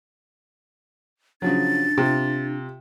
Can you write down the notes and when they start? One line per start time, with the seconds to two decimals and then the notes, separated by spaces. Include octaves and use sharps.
1.42 C#3 F3 F#3 D4 A6
1.98 C3 F4